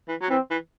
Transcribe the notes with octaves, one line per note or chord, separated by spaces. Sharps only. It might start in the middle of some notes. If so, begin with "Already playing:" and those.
E3
F#3
E3 C4
E3